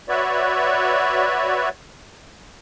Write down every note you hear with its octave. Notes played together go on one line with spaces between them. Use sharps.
F#4 B4 C#5 D5 E5